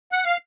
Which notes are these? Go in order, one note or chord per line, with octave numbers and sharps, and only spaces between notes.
F#5
F5